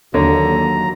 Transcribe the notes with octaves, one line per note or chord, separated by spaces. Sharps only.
D#2 D3 F#3 C#5 A#5